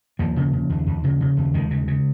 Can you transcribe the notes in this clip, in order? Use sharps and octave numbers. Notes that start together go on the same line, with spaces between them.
D#2 F3 A#3
C#3
C#3
D#2
D#2
C#3
C#3
D#2
D#2 D#3 G#3
C#3
C#3